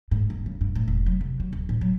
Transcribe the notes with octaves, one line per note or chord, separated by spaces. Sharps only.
G#2
D#1
C#3
G2
A2
E1
F#3
C3
F#3
D1
A2
F#3